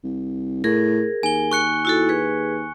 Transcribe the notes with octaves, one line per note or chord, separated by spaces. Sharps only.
C2
A2 G#4 A#4
D#2 G#5 G7
C#6 F#6 C#7
E4 F#4 A4
G#4 B4